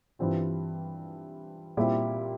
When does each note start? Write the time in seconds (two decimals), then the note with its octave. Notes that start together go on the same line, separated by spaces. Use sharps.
0.19 G2 E3 G3 C4 F4
1.77 A#2 G3 C4 E4 G4